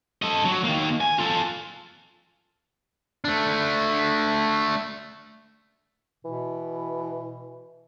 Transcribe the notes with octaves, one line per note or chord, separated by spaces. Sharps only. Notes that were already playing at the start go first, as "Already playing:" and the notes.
A4 D#5
F#3
D#3 A#3
G#5
F4 A4
A3 D4
B2 E3